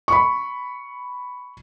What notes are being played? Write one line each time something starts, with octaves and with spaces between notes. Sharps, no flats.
B5 C#6